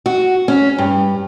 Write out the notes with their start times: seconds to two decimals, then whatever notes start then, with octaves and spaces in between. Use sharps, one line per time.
0.06 F#4
0.48 C#4
0.78 G2